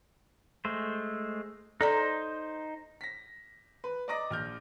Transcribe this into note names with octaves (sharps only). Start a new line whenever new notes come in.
G#3 A3 C5
D#4 A4 C5 D5 A#5
A#6 B6
B4
D5 D#5 A#5 D6 D#6 A#6
A#1 F6 G6